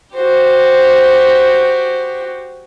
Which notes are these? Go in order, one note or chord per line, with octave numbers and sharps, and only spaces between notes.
F#4 G4 C5